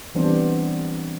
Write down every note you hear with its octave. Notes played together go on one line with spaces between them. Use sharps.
E3 G3 B3 C4 D4 C5